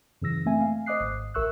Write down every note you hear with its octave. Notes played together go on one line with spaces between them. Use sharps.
F#2 C#3 E3 E6 A#6
A3 A#3 C4 E5 G#5
F5
C5 D#5 D6 D#6 F#6 C7
G#1
A#1 A#4 E5 C#6 E6 F#6